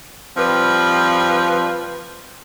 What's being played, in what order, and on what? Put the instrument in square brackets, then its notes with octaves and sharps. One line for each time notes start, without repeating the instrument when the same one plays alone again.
[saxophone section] F3 G3 C4 B4